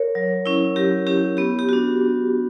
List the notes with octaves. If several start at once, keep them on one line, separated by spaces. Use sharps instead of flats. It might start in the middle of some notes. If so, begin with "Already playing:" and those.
Already playing: A#4 C#5
F#3
C#4 E4
F#3 G4
C#4 E4 G4
B3 G4
G4
D4 F#4